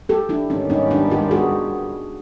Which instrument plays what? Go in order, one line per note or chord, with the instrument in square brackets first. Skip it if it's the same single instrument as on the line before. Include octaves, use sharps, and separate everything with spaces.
[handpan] G4 A4
D4 E4
[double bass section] G#2 D#3 G3 B3 [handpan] C#4 D#4
[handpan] C#4 D#4
D4 E4
F4 G4
F#4 G#4